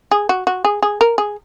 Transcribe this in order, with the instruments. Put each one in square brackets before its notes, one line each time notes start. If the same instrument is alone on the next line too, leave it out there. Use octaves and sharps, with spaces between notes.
[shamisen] G#4
F#4
F#4
G#4
G#4
A#4
G#4